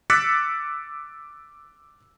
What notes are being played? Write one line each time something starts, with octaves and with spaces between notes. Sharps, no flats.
D6 E6 F#6 A6 B6 C#7